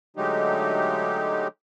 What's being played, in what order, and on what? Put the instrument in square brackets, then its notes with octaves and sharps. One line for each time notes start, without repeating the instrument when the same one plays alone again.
[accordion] D3 F#3 G#3 A3 D#4 G4